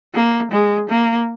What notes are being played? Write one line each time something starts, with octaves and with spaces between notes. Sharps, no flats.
A#3
G#3
A#3